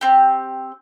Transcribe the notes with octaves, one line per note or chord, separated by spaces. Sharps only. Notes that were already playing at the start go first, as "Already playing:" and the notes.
C4 G4